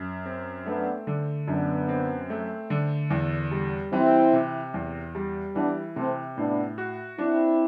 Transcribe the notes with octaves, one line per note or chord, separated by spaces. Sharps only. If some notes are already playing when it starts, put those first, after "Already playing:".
Already playing: F#2
C4
A3 B3 D4
D3
F#2 B3 D4
C4
A3
D3
E2
G3
E3 C4 E4
C3
E2
G3
E3 B3 D4
C3 A3 C4
A2 B3 D4
F#4
C4 D4 E4